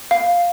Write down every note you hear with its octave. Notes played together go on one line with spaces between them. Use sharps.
F5